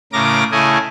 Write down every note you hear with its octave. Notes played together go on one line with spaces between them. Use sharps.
A2 C#3 A#4 D6 A#6
C#3 A3 E4 D#5 G#5